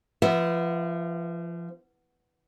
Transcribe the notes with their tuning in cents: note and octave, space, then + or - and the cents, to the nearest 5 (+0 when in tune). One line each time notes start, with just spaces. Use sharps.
F3 -30 B3 +0 E5 -10